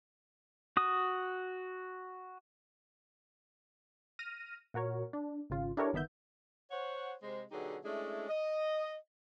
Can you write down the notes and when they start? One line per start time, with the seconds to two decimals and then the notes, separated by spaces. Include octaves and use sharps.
0.77 F#4 D#6
4.19 F6 A#6 D#7
4.74 A#2 F#4 A#4 C#5
5.13 D4
5.50 G#1 C#3 F4
5.77 D4 E4 G4 A4 A#4 C#5
5.93 G1 D#3 B3 E5 G6
6.71 C5 C#5 F#5
7.22 C3 G#3 C5
7.51 B2 D3 F#3 D#4 G4 G#4
7.84 G#3 A3 C#4 D4 E4 G#4
8.29 D#5